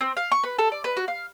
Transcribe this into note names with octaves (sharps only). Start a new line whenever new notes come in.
C4
F5
C#6
B4
A4
D5
B4
F#4
F5